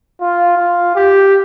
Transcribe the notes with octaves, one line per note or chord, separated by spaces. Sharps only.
F4
F4
G4